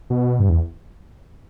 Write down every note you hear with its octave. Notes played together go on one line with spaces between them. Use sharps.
B2
G2
E2